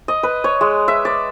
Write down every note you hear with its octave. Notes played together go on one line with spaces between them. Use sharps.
D#5
B4
C#5
G#3
E5
D5